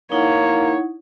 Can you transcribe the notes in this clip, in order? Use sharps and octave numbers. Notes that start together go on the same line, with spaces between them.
A#3 D#4 E4 C#5 F#5